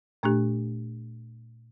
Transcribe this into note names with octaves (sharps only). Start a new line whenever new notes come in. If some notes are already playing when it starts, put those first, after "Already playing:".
A#2 A3 D4 G4